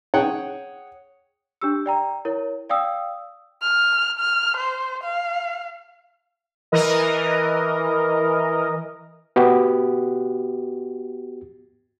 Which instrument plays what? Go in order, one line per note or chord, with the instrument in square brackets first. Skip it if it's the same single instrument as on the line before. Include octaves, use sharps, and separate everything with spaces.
[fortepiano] G#4 C#5 F#5 G5
[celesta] D4 G4 E6
D5 G5 A#5
E4 A#4 C#5
D5 F5 G5 D#6 E6
[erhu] F6
F6
C5
F5
[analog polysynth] E3 A#4 D#5
[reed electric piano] B3 F#4 G4